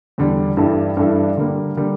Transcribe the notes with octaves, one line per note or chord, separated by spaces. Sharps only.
E2 D3 G3 D4
G2 E3 G3 D4 A4
G2 E3 G3 D4 A4
D3 G3 A#3
D3 G3 A#3